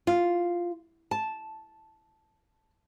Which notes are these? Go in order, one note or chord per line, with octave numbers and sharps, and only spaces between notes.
F4
A5